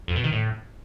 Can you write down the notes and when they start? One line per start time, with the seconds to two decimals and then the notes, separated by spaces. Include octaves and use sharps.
0.08 F2
0.16 B2
0.24 D#3
0.32 A2